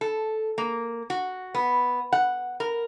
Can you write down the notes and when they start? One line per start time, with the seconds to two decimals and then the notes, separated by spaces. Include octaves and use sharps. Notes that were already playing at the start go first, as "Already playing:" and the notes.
0.01 A4
0.58 A#3
1.10 F#4
1.55 B3
2.13 F#5
2.60 A#4